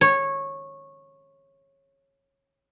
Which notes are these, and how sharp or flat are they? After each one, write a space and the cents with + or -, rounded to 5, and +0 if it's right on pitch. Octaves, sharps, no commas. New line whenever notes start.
C#5 -15